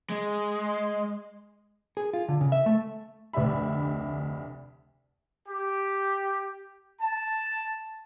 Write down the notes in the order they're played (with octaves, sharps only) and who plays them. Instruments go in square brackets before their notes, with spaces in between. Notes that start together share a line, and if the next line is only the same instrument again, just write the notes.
[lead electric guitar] G#3
[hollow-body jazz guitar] G#4
F4
D3
C#3
E5
A3
[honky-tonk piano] F1 D2 D4 G4 E5 B5
[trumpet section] G4
A5